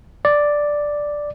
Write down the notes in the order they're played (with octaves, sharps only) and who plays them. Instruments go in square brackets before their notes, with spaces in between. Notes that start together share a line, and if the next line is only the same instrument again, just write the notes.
[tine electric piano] D5